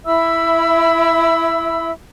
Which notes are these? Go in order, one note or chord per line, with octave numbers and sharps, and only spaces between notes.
E4 E5 B5 E6